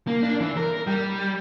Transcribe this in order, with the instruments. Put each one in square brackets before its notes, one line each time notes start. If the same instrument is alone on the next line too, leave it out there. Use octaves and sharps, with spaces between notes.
[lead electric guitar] A#3
D4
E3
A#4
G3